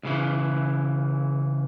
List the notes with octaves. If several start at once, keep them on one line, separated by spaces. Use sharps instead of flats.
C#2 C#3 E3